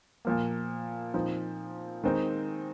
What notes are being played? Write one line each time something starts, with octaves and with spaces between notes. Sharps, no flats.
A#2 F3 A#3
A#2 F3 C4 D#4
D#3 G#3 C4 D#4